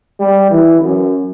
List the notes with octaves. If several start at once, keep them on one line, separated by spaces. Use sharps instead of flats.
G3
E3
F#2